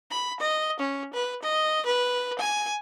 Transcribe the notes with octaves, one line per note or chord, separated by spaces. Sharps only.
B5
D#5
C#4
B4
D#5
B4
G#5